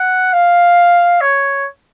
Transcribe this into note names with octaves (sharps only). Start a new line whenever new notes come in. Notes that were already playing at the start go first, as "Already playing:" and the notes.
Already playing: F#5
F5
C#5